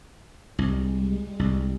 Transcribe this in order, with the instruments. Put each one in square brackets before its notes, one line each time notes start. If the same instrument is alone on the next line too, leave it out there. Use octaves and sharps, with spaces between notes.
[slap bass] C2 [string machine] G3 G#3
[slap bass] C2